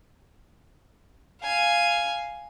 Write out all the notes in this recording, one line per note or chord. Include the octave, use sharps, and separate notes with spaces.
F5 G#5